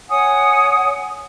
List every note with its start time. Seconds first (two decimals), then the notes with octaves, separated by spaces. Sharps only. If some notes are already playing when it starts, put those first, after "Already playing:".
0.09 C#5 F#5 G#5 D#6